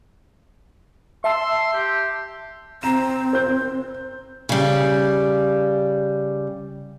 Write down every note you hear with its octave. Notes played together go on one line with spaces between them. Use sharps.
E5 A5 C6 E6
G4
C4 A#5 E7
C5 G6
C#3 G3